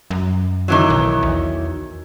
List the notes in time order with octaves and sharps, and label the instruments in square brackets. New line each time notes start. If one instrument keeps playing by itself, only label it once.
[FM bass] F#2
[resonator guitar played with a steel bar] D#3 E3 F#3
[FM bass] B1
E2